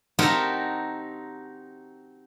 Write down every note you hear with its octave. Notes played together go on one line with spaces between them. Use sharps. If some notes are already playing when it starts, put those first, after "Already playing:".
C4 D#4 F#4 G4 A4 A#4